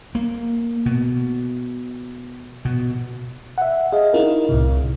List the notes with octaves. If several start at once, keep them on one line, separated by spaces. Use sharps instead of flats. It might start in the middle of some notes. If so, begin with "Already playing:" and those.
A#3
B2
B2
E5 F#5
G#4 D#5 F5
D#4 E4 A#4
C2 A2 C3